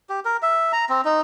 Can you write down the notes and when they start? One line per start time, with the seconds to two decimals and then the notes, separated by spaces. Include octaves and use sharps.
0.09 G4
0.25 A#4
0.42 E5
0.73 A#5
0.89 C4
1.05 D#4